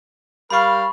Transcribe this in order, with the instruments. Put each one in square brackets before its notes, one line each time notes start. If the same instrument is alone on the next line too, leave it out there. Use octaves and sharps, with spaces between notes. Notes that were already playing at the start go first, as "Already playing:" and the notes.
[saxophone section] G3 A#4 F5 [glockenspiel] B5 C#6